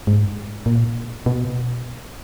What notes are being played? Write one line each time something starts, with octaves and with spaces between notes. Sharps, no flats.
G#2
A#2
B2